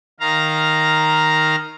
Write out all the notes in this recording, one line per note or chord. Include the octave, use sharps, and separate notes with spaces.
D#3 F5 A#5